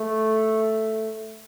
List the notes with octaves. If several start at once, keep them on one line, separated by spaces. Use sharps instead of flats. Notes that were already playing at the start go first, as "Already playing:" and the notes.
Already playing: A3